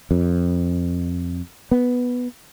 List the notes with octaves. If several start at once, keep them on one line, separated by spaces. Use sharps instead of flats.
F2
B3